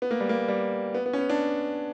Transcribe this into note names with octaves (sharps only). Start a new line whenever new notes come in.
B3
A#3
G3
A#3
G3
B3
B3
C#4
B3
D4